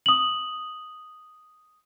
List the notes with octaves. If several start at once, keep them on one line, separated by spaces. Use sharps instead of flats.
D#6 F#7